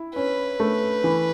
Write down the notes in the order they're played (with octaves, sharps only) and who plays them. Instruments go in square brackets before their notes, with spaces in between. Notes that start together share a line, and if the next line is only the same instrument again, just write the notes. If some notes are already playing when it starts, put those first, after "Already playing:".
Already playing: [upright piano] E4
[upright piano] C#4 [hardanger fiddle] B4
[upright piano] A3
E3